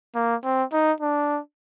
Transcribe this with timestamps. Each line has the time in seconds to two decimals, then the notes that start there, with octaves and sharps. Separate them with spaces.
0.15 A#3
0.44 C4
0.72 D#4
1.00 D4